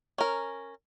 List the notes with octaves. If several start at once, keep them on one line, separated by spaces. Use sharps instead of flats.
C#4 A#4